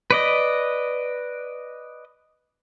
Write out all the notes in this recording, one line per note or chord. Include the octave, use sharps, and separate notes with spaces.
B4 D5 D#5